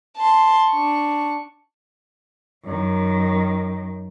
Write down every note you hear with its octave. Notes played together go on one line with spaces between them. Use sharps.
A5 C6
D4 C#6
F#2 D#3